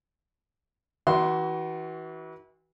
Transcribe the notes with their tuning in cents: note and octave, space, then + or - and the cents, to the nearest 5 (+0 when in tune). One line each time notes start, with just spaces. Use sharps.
E3 -30 F#4 +25 C6 +0